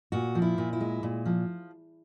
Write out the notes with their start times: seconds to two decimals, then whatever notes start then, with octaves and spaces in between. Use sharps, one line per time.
0.12 A#2 F#4
0.35 F3
0.42 E4
0.58 A#2
0.73 E4
0.80 G#3
1.03 A#2
1.25 F3